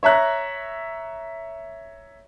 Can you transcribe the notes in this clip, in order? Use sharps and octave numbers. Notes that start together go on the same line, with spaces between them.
C#5 E5 A#5 F#6